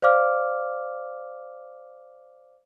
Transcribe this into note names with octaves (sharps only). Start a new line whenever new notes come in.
C5 D5 F5 D6 F6